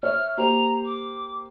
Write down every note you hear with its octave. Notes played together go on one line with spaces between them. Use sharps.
C#5 E5 F6
A#3 G4 C5 A#5
D6